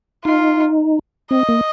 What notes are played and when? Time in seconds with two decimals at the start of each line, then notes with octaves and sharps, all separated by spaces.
0.25 D#4 F4
1.31 C4 D#5
1.49 A#3